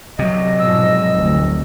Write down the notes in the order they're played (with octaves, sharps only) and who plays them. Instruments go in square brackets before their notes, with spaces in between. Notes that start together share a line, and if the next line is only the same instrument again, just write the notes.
[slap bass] C3 F#3 [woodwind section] D#5
[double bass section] G#2 B2 F3 [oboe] E6
[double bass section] F1 D2